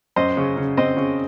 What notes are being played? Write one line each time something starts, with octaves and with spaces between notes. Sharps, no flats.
F#2 C5 D#5
C#3
C#3
C4 C5 D#5
C#3